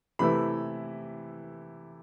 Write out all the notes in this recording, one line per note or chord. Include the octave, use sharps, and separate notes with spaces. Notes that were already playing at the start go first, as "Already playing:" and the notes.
C3 E3 A3 E4 B5